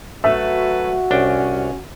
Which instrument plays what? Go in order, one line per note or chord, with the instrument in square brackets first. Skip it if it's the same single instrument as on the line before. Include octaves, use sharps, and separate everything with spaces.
[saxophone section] F#3 A4 B4 [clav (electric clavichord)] A3 [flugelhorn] F#4 [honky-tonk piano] E5
[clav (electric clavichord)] C2 D4 G5 [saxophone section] C#4